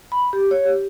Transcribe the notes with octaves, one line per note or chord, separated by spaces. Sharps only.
B5
G4
C#5
G4